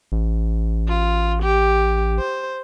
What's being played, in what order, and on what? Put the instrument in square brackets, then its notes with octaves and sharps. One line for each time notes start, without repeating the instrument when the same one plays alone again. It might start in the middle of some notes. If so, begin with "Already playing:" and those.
[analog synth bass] A1
[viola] F4
G4
C5